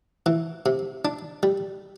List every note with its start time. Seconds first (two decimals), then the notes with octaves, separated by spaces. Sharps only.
0.26 E3
0.66 C3
1.05 D4
1.43 G3